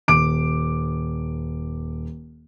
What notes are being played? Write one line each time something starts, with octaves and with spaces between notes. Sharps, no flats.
D#1 D6 D7